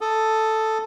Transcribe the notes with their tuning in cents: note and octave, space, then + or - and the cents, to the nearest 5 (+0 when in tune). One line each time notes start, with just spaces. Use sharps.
A4 +0 D#6 +0